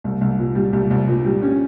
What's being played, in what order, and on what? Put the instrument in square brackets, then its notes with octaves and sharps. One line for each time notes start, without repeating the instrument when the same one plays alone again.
[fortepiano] C2
C2
A#2
G3
C2
C2
A#2
G3
C#4